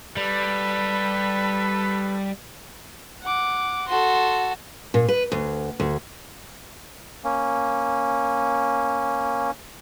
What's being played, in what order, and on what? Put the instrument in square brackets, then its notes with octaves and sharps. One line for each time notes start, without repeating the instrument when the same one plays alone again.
[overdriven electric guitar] G3 [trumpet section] A4 B4
[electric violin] F#5 D6
[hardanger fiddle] F#4 A4 [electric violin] C6
[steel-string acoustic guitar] A#2
B4
D2
D2
[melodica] A#3 C#4